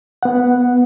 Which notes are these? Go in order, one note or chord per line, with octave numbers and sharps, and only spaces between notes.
B3 F#5